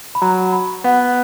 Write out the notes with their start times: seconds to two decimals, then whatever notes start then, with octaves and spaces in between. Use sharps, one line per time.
0.15 B5
0.21 F#3 A#5
0.52 B5
0.84 B3 F#5